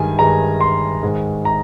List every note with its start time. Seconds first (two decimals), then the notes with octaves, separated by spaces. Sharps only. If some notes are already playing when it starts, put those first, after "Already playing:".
Already playing: G2 D#3 G#3 G#5
0.19 G2 D#3 G#3 A#5
0.61 C6
1.03 G#2 D#3 G#3
1.45 A#5